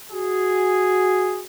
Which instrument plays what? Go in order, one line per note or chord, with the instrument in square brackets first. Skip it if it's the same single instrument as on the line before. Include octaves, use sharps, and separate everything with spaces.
[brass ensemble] F#4 G#4